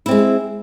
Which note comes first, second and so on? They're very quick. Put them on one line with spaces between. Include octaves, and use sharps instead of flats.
E4 C4 G#3